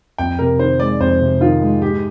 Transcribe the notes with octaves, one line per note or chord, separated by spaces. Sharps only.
F2 G5
C3 A#4
D#3 C5
G#3 D5
F2 C5
C3
D#3 F4
G#3
G#2 G4